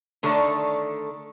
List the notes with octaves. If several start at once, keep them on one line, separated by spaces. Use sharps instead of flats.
D3 D#3 A3 D4 A4 C#5